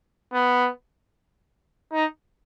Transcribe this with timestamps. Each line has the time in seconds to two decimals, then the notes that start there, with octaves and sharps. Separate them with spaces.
0.33 B3
1.93 D#4